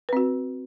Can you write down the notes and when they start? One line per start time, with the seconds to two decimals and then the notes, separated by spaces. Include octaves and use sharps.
0.09 B4
0.13 C4
0.17 F#4